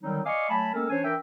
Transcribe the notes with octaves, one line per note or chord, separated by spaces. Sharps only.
D3 D#3 F#3 G3 C4 D#4
D5 D#5 F5 G#5 C#6 D6
F#3 A3 G#5 A5 B5
G#3 A#3 C4 C#4 A4 A#4
E3 C#4 D4 C5 C#5 G#5
E3 D4 A#4 E5 G5